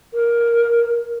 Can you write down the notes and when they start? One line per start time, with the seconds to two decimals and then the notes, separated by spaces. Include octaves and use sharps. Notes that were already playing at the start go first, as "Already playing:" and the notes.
0.14 A#4